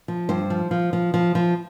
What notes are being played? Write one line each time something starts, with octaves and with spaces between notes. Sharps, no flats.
F3
G2 C5
F3
F3
F3
F3
F3